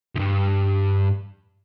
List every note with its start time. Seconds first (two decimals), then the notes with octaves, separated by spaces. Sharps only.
0.16 D2 G2